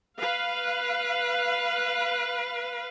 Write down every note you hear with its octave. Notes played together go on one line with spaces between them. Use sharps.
B4 F5